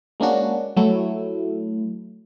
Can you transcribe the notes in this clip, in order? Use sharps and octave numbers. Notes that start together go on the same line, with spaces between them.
G#3 A#3 C#4 D4 F#4
F#3 A3 E4